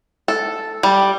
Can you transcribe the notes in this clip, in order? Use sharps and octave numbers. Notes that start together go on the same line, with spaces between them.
A4
G3